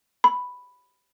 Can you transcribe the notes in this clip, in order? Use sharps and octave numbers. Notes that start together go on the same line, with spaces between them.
B5